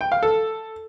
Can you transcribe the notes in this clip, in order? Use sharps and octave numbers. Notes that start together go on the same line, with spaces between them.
G5
F5
A4